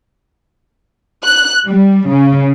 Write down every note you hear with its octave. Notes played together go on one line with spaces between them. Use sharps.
F#6
G3
C#3